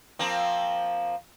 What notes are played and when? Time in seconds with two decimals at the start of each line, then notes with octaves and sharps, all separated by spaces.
0.19 F3 A#3 C4